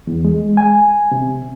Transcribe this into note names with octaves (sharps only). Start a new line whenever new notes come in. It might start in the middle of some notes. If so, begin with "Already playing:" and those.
E2
G#3
G#5
C3